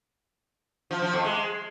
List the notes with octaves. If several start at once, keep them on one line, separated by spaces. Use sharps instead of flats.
F3
F3
F2
G#3